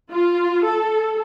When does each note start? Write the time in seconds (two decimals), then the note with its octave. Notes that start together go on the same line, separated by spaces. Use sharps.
0.11 F4
0.65 A4